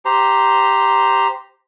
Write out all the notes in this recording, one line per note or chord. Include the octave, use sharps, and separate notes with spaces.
G4 C5 A#5